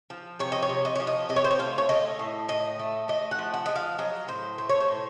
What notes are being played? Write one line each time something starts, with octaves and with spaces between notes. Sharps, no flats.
F3
C3 C#5
D#5
C#5
C3
D#5
F3 C#5
D#5
C3 D#5
C#5
C5
C#5
A3 F5
C#5
A3 D#5
A2
A2 D#5
A3
A3 D#5
F#5
F3
F#5
F3 D#5
F5
F#3 D#5
A2 C5
A3 C5
C#5
C5
A2